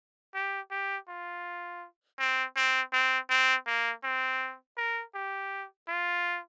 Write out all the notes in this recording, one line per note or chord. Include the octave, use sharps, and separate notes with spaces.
G4
G4
F4
C4
C4
C4
C4
A#3
C4
A#4
G4
F4